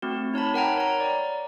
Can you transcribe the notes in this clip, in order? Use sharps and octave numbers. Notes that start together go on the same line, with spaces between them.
A3 C4 F#4
D#4 C#5 A5 B5
A#4 F#5 G5 A#5
C#5 A#5
D5